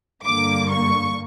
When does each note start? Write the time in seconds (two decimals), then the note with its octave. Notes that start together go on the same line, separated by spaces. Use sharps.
0.25 G2 D3 A#3 D6
0.70 C#6